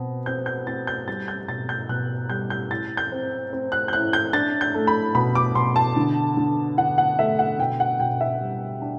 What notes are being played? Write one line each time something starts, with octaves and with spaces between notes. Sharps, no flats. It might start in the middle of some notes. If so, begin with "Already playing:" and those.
Already playing: B2 C4
C4 G6
G6
C4 A6
G6
G3 A6
G6
B2 A6
G6
B2 F#6
G3 G6
G6
A2 A6
G6
C4
C4
F#6
G6
A2 F#6
G6
D4 A6
G6
A3
B5
B2 B5
D6
B2 C6
A5
D3
D3
D3 F#5
F#5
A3 E5
F#5
B2 G5
F#5
B2 G5
E5
G3
D4